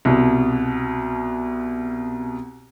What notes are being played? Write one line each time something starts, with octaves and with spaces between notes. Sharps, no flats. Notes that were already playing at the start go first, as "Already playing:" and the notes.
C2 B2